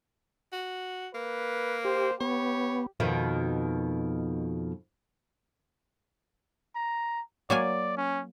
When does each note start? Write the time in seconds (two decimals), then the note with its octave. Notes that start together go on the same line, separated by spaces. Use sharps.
0.52 F#4
1.14 A#3 B4
1.85 G4 C5
2.20 B3 G4 C#5
3.00 F2 B2 D#3
6.75 A#5
7.50 F#3 A#3 D5 G#5
7.97 C#4